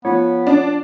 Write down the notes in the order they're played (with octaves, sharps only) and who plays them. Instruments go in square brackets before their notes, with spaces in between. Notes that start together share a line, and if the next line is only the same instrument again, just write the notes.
[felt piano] F3 [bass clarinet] B3 [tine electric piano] C#5
[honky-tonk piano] D4